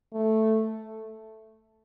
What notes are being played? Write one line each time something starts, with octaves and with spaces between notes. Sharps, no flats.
A3